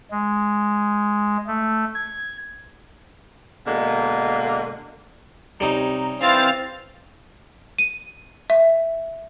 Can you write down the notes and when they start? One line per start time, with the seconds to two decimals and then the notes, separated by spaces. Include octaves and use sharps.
0.11 G#3
1.47 A3
1.94 G#6
3.66 B2 D3 G#3 A#3
5.60 C3 G3 C#4 D#4 A#5
6.21 E3 C4 C5 F5 F6 A6
7.78 D#7
8.50 E5